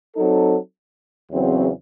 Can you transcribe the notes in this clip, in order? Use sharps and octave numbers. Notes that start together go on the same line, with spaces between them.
F#3 C4 D#4 A4
E2 C#3 F#3 C4